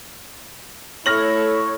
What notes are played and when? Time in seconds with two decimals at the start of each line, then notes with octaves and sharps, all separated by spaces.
1.06 A3 E4 C#5 F6 A#6 F#7